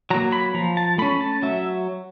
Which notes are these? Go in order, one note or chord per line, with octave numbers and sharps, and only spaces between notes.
F#3 A#3 A#5
B5
F3 A#5
A5
A3 C#4 B5
A5
F#3 E5